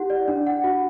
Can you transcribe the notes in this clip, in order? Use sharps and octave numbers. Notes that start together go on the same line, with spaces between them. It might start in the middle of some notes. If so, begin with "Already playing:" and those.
Already playing: E4 G4 F#5
D5
D4
F#5
F#4